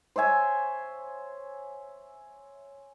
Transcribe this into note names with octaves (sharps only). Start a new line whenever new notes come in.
C5 C#5 E5 G#5